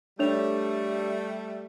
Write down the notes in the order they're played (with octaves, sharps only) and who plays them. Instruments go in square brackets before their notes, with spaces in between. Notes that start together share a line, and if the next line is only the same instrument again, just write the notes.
[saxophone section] G3 A3 [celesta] D4 C#5 F7